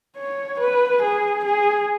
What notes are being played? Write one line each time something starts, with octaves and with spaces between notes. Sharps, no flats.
C#5
B4
G#4
G#4